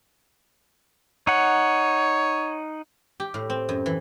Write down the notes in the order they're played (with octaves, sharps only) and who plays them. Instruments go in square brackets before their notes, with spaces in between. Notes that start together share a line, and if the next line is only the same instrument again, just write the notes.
[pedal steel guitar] D#4 F#5 [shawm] C#5
[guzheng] G4
A2
C4
F#2
E3